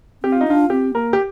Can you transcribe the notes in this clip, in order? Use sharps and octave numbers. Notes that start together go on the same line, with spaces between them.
C4 G4
F4
D#4
D4 F4
C4 G4
A#3 A#4
G4